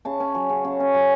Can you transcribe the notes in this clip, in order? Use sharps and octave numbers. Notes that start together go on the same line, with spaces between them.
C#3 A5
C#4
F#3
C#3
C#3
C#4
F#3